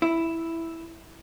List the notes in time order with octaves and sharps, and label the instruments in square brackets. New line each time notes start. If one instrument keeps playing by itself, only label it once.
[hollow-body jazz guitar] E4